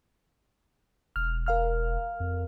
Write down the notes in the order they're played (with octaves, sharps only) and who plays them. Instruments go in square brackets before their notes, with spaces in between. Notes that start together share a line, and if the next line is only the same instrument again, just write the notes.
[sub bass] E1 [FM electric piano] F6
[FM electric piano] A#4 F5 F6
[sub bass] F2